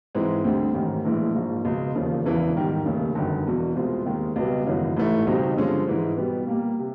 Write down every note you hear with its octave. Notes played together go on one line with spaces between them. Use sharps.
G#2 E3 G#3 C4
D2 D3 G3 C4
A1 G#2 D#3
A#1 A2 E3 G#3
A#1 G#2 F3
C#2 B2 G#3
E1 D#2 C#3 F3
E1 E2 C#3 E3
G#2 D#3 G3
F1 D#2 C#3
G1 F#2 D#3
E1 E2 B2
C2 B2 G#3 C4 F4
D#2 D#3 G#3
C#2 B2 G3 B3
G#1 F#2 C#3 E3
A1 G#2 E3 A3
C#2 B2 G3 C4 D#4
G2 D3 F3 G#3 C#4
G#2 E3 G#3
B2 G3 B3
A#2 G3 A#3
C3